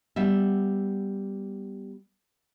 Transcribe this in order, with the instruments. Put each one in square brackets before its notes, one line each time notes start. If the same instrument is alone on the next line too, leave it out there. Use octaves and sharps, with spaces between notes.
[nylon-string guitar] G3 B3 E5